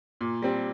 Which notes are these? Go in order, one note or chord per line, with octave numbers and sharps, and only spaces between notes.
A#2
G3 C4